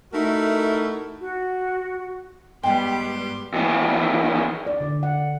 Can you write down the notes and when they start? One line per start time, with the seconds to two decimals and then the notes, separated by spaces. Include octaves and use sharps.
0.13 A3 D#4 E4 F#4 A4 A#4
1.21 F#4
2.63 G#2 G3 G#3 B3 G5 C6 D6
3.54 D#2 E3
4.67 D5
4.81 D3
5.03 F#5